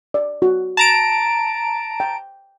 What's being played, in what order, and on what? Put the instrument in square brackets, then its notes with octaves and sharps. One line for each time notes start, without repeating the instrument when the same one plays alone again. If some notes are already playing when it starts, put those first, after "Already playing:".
[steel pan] D5
F#4
[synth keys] A5 A#5 D7
[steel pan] G5